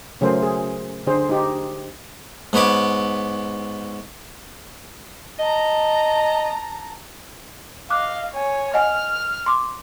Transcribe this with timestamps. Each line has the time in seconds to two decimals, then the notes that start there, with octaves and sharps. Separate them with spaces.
0.21 C#3 F#3 A3 G#4 A#4 C5
0.43 G#4
1.07 D3 C4 G#4 C5
1.29 D#4 G4
2.53 G#2 B3 C#5 B5 D6
5.39 D#5 A5 A#5
7.90 D#5 F5 D6 F6 F#6
8.33 C#5 G#5
8.74 D#5 F#5 G#5 F6
9.46 C6 D6